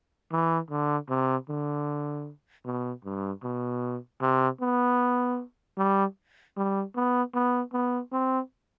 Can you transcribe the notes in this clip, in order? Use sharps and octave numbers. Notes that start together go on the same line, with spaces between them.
E3
D3
C3
D3
B2
G2
B2
C3
B3
G3
G3
B3
B3
B3
C4